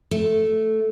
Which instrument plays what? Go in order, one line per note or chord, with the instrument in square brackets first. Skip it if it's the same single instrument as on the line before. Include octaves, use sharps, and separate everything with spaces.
[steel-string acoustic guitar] A3